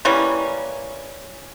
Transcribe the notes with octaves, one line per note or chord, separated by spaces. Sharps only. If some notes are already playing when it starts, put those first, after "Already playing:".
E3 G3 A#3 C#4